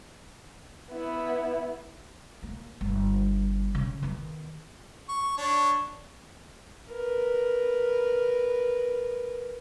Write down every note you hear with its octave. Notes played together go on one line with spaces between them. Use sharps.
B3 E4
A#3
G1
C#3
D#3 B3
C#6
D4 C#5
A#4 B4